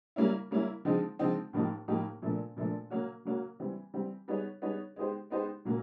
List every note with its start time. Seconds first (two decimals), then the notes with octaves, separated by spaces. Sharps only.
0.16 G3 A#3 C#4 E4
0.51 G3 A#3 C#4 E4
0.85 D3 F3 G#3 C4 D#4
1.19 D3 F3 G#3 C4 D#4
1.53 A2 F3 A#3 D#4 G4
1.88 A2 F3 A#3 D#4 G4
2.22 A#2 F3 A3 D4
2.57 A#2 F3 A3 D4
2.90 F#3 A#3 C#4 F#4
3.25 F#3 A#3 C#4 F#4
3.60 E3 G3 C4
3.94 E3 G3 C4
4.28 G3 B3 D#4 G#4 C#5
4.62 G3 B3 D#4 G#4 C#5
4.96 G#3 B3 D#4 G4 C5
5.30 G#3 B3 D#4 G4 C5
5.65 A#2 F#3 A#3